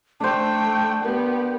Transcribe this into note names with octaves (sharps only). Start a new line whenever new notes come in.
A3 D4 C5 G5 A5
B3 G4 A#4